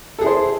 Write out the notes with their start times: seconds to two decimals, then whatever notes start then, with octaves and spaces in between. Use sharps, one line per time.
0.19 A4
0.21 G#4
0.24 E4
0.27 C5